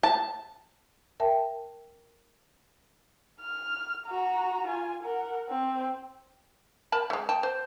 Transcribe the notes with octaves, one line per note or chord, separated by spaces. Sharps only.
A5
A#4 E5 G5 A5
F6
F#4 A#5
F4 G#5
A#4 F#5
C4
A#4 A5 B5
G#3 A3
G5 A5
C5